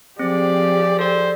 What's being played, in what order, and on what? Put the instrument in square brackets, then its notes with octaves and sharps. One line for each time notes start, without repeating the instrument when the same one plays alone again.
[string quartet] F3 G4 G#4 [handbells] C4 [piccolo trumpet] D5
[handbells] A4 D5 [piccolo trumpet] C5